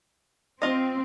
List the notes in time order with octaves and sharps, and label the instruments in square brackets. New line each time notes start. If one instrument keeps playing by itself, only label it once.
[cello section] C4 [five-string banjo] F4 D#5